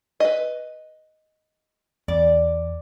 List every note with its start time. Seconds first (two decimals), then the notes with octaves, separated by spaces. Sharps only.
0.20 B4 D#5
2.08 E2 D5